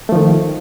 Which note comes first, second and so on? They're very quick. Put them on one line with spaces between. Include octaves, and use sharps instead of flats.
A3 F3 D#3